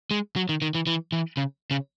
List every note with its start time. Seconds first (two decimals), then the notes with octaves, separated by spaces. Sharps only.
0.11 G#3
0.36 F#3
0.49 D#3
0.62 D#3
0.75 E3
0.87 E3
1.12 E3
1.37 C#3
1.71 C#3